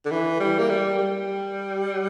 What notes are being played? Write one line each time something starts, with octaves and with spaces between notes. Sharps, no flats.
D3
E3
G3
A#3
G3
G3